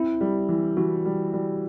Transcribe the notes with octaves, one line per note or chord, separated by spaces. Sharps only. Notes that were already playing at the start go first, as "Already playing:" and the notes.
Already playing: C4 E4
G3
E3
E3 F#4
G3
G3